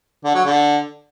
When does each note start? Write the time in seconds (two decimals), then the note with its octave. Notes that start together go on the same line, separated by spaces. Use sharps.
0.25 D3
0.35 F#3
0.45 D3